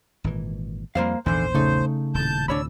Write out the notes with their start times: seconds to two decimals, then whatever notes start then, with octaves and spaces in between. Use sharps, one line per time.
0.24 G#1 A#2 E3
0.95 F2 G3 A#3 C5 F5
1.26 A#1 E2 G#2 D3 E3 C5
1.55 C#3 A3 D#4
2.14 D#1 A2 A5 G6
2.48 D2 A2 C3 D4 C#5 B5 E6